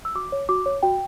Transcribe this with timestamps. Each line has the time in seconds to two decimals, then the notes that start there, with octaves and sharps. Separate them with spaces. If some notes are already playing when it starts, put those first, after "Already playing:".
0.05 E6
0.15 F#4 D6
0.32 C#5
0.49 F#4 D6
0.66 C#5
0.83 F#4 G5